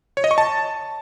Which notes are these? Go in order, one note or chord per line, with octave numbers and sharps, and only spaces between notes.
C#5
D#5
C#6
A5